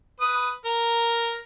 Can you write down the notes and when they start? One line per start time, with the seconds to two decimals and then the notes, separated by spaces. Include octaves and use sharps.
0.20 B4 D#6
0.65 A#4